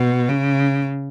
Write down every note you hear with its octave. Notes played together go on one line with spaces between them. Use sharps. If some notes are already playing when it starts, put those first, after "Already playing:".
Already playing: B2
C#3